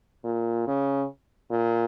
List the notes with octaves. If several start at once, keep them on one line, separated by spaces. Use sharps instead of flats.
A#2
C#3
A#2